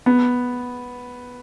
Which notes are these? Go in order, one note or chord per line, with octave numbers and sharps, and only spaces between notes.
B3